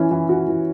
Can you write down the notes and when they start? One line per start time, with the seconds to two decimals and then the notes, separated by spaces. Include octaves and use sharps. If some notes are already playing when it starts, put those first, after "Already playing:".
Already playing: E3 C#4
0.11 E3
0.29 F#4
0.48 E3